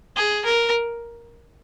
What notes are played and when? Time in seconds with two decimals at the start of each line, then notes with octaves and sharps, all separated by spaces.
0.16 G#4
0.45 A#4